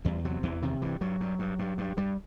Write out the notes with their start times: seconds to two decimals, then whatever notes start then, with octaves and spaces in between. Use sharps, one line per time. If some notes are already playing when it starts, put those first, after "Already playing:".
0.05 E2 G3
0.25 C3 F#3
0.43 E2 E3
0.62 C3 D#3
0.82 G2 E3
1.01 G2 F#3
1.20 G2
1.39 G2
1.59 G2
1.78 G2
1.97 G2 G3